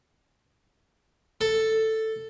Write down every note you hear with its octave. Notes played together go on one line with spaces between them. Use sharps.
A4